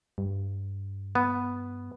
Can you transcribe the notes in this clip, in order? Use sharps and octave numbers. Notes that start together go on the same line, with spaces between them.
G2
B3